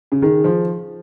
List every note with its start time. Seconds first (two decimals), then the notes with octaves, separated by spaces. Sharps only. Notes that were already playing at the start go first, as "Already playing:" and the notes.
0.12 C#3
0.22 D#3 G#4
0.44 F3